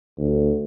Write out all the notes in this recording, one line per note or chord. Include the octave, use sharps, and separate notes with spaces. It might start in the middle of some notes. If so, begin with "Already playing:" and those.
D2